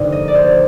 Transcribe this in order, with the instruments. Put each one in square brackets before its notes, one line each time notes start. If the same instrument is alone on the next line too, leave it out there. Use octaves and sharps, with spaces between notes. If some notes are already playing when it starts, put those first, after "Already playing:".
Already playing: [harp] G2 D3 F3 A#3 D#4
D#5
D5
C5